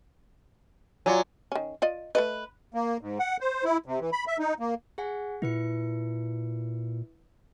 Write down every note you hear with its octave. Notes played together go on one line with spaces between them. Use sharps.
F#3 F4 D5 G#5
D#3 C#4
F4 D5 D#5
A3 A4 B4 D#5
A#3
G#2
F#5
C5
E4
C3
E3
B5
E5
D#4
A#3
G#4 F#5 G#5
A#2 E4 B4 C#7